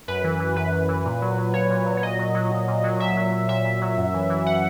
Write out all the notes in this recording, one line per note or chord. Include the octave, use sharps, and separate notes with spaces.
F#2 B4
E3
E3
F#2 B4
F#2
E3
A#2
F#3
F#3
A#2 C#5
A#2
F#3
C#5
A#2 D#5
F#3
F#3
A#2
A#2
F#3
A#2 E5
F#3
F#3
A#2 E5
A#2
F#3
F#2
E3
E3
F#5